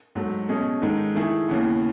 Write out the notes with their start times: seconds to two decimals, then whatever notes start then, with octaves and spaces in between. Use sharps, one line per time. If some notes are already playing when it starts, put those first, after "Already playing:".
0.15 G#2 F#3 A3
0.49 B2 A3 C#4 G#4 D#5
0.82 G#2 D#3 G#3 D#4 A4
1.15 D#3 A3 E4 G#4
1.49 D#2 C#3 E3 B3